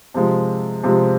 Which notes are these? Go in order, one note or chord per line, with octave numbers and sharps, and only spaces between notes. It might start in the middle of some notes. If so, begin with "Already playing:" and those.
C3 F3 G#3
C3 F3 G#3